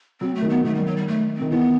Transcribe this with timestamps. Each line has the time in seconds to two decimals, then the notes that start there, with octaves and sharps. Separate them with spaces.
0.21 F#3 C4
0.35 A3
0.42 D#3
0.50 B3
0.64 D#3 A3
0.75 G3
0.86 F#3
0.96 G3
1.08 A3
1.37 D#3 C4
1.51 E3 B3